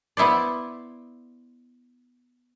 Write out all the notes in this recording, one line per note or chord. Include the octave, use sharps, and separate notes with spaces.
B3 E4 C5 D5